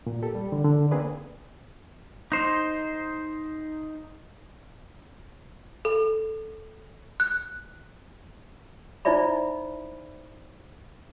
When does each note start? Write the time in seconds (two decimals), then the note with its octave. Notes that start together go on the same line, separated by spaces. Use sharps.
0.07 A#2
0.22 G4 A4
0.35 G3
0.52 D3
0.65 D3
0.91 A#3 C4 D4 G#4 B4 D5
2.32 D#4 C5
5.85 A4
7.20 F#6
9.05 D#4 E4 C5 D5 E5 B5